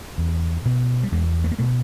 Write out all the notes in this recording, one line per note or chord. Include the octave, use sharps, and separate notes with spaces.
E2
B2
G3
E2 G#3
A3
A#3
B2 A3